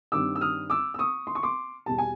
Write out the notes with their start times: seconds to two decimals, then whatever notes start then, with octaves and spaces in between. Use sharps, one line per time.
0.12 G2 D#3 G3 C4 D6 E6
0.36 E6
0.41 D#6 F6
0.70 D6 E6
0.94 E6
0.99 C#6 D#6
1.27 C6
1.35 C#6
1.43 C6 D6
1.86 E2 B2 G3 A5
1.98 G#5